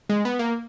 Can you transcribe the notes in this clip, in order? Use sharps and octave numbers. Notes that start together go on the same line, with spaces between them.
G#3
B3
A#3